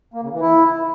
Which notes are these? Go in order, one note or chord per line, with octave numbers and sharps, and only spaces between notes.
A#3
C#3
E3
E4